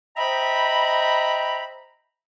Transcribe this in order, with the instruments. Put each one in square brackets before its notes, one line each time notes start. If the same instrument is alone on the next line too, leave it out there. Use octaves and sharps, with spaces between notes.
[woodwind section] C5 D#5 E5 G5 A#5 B5